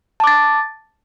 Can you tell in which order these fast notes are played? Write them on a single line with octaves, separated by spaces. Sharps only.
A5 D6 A6